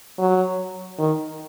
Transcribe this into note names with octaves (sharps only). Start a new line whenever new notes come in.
F#3
D#3